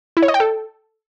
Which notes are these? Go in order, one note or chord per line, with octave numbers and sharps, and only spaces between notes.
E4
C#5
D#5
G5
A4